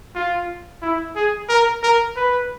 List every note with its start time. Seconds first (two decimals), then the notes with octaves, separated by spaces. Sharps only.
0.15 F4
0.82 E4
1.15 G#4
1.49 A#4
1.83 A#4
2.16 B4